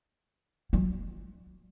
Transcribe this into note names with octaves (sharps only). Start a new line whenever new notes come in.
F#3